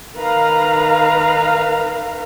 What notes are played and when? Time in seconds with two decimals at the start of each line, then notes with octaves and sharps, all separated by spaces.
0.19 D#3 B4 F5 A#5